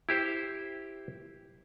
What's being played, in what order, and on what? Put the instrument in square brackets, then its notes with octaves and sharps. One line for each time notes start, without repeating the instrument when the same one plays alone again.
[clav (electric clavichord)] E4 G4 C5